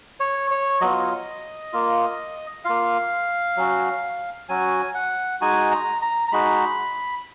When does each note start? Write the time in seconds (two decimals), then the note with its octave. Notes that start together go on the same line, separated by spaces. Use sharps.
0.20 C#5
0.51 C#5
0.81 F#3 B3 F4 D#5
1.73 A#3 F4
2.64 A#3 F4 F5
3.57 F#3 C#4 F#4
4.49 F#3 C#4 F#4 G#5
4.94 F#5
5.41 G#3 D#4 F#4 G#5
5.71 A#5
6.02 A#5
6.28 A#5
6.32 G#3 D#4 F#4 B5